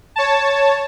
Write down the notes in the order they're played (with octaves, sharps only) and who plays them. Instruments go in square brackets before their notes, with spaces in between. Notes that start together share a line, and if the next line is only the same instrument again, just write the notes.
[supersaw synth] C#5 A5